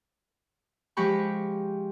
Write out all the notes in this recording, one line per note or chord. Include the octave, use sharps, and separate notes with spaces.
F3 G#3 G4 B5 C#6